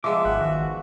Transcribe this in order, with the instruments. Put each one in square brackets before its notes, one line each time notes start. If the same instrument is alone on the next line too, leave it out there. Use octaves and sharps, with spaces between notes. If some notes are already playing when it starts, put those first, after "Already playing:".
[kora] F3 G#3 B3 [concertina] E5 [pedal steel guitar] D6
[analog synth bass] G#1 [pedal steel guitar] F#5
[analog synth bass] D#3 [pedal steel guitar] F#4